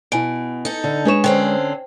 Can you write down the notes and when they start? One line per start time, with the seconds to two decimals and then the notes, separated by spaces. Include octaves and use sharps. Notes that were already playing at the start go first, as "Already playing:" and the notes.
0.12 B2 E4 G#5 D7
0.65 D#4 A4
0.84 D3
1.05 G#3 D4 B4 C#5 E7
1.24 D3 C4 C#4 C5 G5